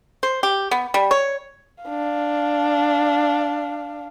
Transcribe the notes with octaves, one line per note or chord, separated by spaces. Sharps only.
C5
G4
B3
G3
C#5
D4 F5